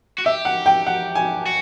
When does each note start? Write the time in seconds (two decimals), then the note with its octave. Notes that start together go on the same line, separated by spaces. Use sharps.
0.18 F#4
0.26 G4 E5
0.45 F#5
0.66 G5
0.87 F#5
1.15 G#5
1.46 F#4